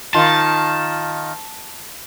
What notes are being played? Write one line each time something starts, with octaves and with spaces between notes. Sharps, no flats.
D#3 F4 A5